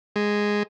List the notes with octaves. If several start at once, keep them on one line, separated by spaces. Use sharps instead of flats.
G#3